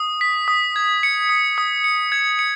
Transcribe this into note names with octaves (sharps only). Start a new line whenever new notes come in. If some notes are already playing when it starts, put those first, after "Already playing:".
Already playing: D#6
B6
D#6
G#6
C#7
D#6
D#6
C#7
G#6
C#7